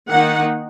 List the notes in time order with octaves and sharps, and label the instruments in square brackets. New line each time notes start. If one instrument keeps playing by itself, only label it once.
[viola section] D#3 A#3 D#4 F#5